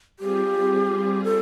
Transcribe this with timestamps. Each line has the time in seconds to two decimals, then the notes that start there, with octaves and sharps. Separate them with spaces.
0.19 G3 C4 F4 G4 G#4
1.24 A4